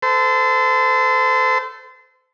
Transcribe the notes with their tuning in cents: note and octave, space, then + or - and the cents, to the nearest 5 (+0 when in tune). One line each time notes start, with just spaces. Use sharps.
A4 +0 C5 -30